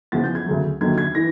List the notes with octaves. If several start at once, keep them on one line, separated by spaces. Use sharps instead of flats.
E2 C#3 F3 A6
G6
G#6
D2 C#3 F#3
D#2 D3 F#3 G#6
G#6
E3 A#6